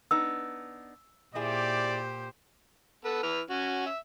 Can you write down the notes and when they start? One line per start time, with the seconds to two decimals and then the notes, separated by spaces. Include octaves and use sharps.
0.11 B3 D4 D#4 E6
1.35 A#2 E4 G4 G#4 C5 D5
3.05 B3 A4 B4
3.23 E3 B4 F6
3.50 C#4 F#4
3.86 E5